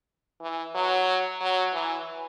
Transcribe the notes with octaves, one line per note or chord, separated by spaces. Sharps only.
E3
F#3
F#3
E3